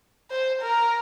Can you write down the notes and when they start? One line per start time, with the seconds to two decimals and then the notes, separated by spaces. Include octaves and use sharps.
0.31 C5
0.61 A#4